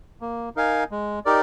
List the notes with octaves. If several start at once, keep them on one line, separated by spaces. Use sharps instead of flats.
A#3
D#4 A#4 F5 G#5
G#3
D#4 G4 A#4 D5